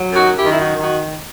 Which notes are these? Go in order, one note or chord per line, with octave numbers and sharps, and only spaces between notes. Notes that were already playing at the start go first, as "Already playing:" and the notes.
Already playing: F#3
F#2
D#4 F#4
F#2
E4 G4
D#3
E4
F#2 D#4 F#4
D#3
D#4 F#4